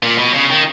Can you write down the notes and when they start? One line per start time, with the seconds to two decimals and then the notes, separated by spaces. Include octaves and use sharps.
0.03 A#2
0.18 B2
0.34 C#3
0.50 D#3